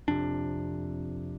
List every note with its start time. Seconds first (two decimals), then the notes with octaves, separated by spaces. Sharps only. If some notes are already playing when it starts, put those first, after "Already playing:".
0.08 F2 C3 D4